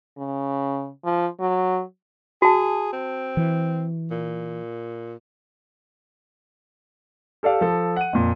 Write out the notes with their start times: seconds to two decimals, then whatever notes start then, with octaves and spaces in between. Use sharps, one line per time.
0.18 C#3
1.05 F3
1.40 F#3
2.42 F#4 G#4 A5
2.93 C4
3.37 E3
4.11 A#2
7.43 G4 A4 D5 F5
7.61 F3 A4
7.96 F#5 D#7
8.13 F2 A#2